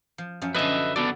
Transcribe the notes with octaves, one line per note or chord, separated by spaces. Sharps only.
F3
F#2 F3 C#4
D3 A4 B4 D#5 E5
B3 F#4 A4 D5